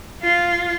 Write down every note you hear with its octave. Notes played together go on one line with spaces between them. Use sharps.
F4